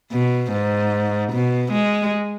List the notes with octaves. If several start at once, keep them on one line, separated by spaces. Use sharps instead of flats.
B2
G#2
B2
G#3